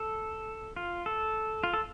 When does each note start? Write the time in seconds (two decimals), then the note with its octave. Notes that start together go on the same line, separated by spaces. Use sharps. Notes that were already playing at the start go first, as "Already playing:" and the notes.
Already playing: A4
0.76 F4
1.06 A4
1.64 F4
1.74 A4